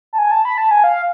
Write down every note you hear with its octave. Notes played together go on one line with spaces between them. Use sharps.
A5
G#5
A5
B5
A5
G#5
F5